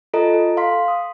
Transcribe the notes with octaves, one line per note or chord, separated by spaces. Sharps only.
F4 A4 D#5 A#5
A4
F5 C6 B6
D#6